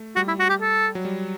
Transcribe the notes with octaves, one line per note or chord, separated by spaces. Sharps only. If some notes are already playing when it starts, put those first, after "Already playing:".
Already playing: A3
G3 F#4
E4
F#4
G4
A4
F#3
G3